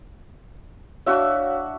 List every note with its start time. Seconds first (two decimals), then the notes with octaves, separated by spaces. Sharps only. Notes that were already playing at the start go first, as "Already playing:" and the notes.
1.06 D4 F#4 C#5 E5 F5